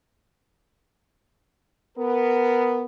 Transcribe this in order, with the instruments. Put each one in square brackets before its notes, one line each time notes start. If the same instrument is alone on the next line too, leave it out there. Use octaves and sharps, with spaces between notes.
[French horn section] B3 A#4